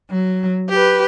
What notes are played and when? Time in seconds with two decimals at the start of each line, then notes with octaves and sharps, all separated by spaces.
0.13 F#3
0.69 G4 B4